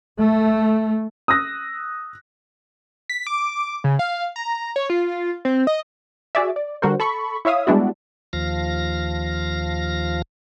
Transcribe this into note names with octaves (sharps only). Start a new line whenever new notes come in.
A3
D#6 E6 F#6 A#6
B6
D6
C#3
F5
A#5
C#5
F4
C4
D#5
F#4 G#4 D5 E5
D5
D3 G3 F#4 A#4 C5
A4 B5 C#6
E4 C#5 E5 F5 D#6
G3 G#3 B3 D4 E4 F#4
D#2 F3 F5 A#6